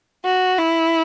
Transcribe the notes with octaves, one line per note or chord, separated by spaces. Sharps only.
F#4
E4